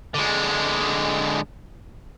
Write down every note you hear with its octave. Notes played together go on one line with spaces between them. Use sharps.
D3 G#3